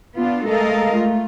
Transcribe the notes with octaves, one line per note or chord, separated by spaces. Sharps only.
B3 D4 F4
G#3 A3 A4 A#4 D#5 F5
A3 F4